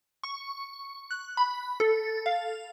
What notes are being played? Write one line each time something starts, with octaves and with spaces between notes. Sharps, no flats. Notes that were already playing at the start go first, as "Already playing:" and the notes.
C#6
F#6
B5
A4
F5